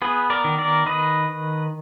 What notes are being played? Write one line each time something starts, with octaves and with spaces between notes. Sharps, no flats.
B3 G#4 B4
A#4 D5
D#3
A#4 D5
D#3 B4 D#5